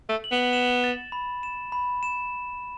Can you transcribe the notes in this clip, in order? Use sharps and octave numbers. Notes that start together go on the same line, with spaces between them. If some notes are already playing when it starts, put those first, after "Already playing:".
A3
F#7
B3
E7
A6
B5
E7
B5
E7